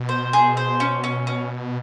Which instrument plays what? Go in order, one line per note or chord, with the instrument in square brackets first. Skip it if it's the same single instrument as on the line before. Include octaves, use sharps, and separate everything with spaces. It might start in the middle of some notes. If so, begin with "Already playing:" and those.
Already playing: [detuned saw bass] B2
[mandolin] C5
G#4
C5
C#4
C#4
C#4